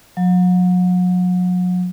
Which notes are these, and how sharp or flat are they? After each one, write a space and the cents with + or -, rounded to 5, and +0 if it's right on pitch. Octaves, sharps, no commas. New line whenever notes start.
F#3 -40